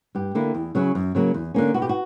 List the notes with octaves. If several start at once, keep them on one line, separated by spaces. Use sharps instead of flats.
G2 G4
D3 A#3 E4
E2
C#3 F#3 C#4 E4
F#2
C#3 F#3 A#3
E2
D3 A#3 C#4
B2 F#4
G4
F#4